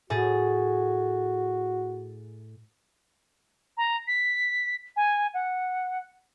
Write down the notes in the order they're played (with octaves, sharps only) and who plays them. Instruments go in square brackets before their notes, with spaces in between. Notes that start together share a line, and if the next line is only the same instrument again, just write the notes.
[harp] A2 G#4 A6 [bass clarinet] F#4
[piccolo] A#5
B6
G#5
F#5